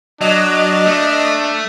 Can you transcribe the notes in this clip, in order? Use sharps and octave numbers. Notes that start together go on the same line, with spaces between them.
F#3 D4 D#5
A3